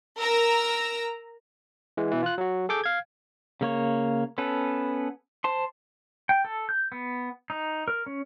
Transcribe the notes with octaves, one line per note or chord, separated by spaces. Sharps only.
A#4 A#5 E6
E3 G#3
B2 E3
F4 F#6
F#3 F#4
G#4 A4 D6 G6
F5 G#6
C#3 A#3 C#5
B3 C#4 A4 B4
C5 A5 C6
G5
A4
G6
B3
D#4
A#4
C#4